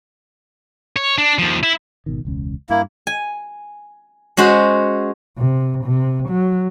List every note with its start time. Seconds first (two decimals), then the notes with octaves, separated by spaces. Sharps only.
0.96 C#5
1.18 D4
1.39 D#2 F3
1.63 E4
2.06 G#1 B2 D#3
2.25 E1 C#2 C#4
2.70 G2 A#3 E4
3.07 G#5
4.37 G#3 C#4 F#4 C5
5.38 C3
5.85 C3
6.29 F#3